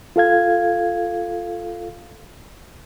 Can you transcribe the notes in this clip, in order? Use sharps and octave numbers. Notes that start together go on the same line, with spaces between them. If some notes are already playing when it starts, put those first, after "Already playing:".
F4 A4 F5 G#6